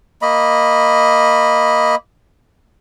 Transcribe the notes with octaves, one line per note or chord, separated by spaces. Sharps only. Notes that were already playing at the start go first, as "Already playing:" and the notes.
A#3 D#5 B5